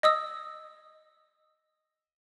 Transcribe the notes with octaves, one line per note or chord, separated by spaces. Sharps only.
D#5 D#6 E6